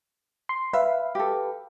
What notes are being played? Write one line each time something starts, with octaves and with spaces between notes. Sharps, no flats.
C6
B4 E5 F5
G4 A4